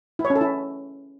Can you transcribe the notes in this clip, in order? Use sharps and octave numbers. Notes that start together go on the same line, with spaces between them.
E4
C#5
C#4
A4
E4